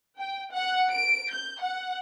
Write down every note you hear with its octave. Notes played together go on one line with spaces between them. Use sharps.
G5
F#5
D7
G6
F#5